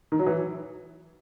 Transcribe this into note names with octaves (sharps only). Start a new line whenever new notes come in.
D#3
F#3
E3